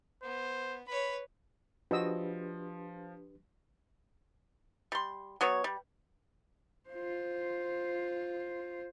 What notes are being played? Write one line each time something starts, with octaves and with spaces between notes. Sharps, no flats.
B3 C5
B4 C#5 B5
F3 D4 F#4 G4 B4 D#5 E6
G3 C6
F#3 B3 C#5
G3
F4 C5